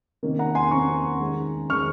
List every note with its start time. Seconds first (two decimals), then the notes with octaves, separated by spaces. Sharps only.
0.23 C3 D#3 A#3 C#4
0.39 F#5 A#5
0.55 G#5 C6
0.71 C3 D#3 A#3 C#4 A#5 C#6
1.20 D#3 G#3 C#4
1.69 D#3 G#3 C#4 C#6 F6